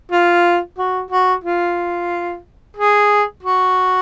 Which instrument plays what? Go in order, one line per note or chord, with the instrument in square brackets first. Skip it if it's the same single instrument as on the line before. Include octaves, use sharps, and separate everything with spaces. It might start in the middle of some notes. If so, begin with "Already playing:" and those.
[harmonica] F4
F#4
F#4
F4
G#4
F#4